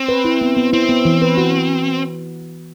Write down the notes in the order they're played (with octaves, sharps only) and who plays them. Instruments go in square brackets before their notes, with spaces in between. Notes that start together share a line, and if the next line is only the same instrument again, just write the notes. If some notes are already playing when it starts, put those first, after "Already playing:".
Already playing: [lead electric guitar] C4
[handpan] B4
E4
B3
B3
[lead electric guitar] C4 [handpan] E4
[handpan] B3
E3
B4
F#4